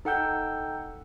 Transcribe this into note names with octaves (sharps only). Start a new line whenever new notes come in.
D#4 A4 F#5 G5 E6 G6